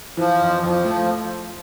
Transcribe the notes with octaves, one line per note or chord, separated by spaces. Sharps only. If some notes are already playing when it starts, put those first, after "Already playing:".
E3 F3
F2
F2 F3
A3